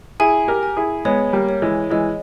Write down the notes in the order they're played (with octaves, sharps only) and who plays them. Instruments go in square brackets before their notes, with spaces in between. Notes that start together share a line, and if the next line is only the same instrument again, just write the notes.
[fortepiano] E4 G#4 [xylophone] G#5
[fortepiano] G4 A#4
[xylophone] G#5
[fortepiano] E4 G#4
[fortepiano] G#3 B3 [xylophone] C#5
[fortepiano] G3 A#3
[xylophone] C#5
[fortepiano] E3 G#3
[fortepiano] E3 G#3 [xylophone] D#5